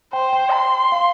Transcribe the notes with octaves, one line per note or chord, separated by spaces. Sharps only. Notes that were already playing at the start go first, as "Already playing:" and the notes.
C5 G5
G5
C6
F5